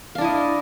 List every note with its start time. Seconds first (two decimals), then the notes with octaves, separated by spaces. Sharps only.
0.15 F5
0.18 D4
0.21 E4
0.24 D#5